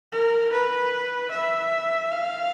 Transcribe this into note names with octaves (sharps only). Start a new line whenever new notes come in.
A#4
B4
E5
F5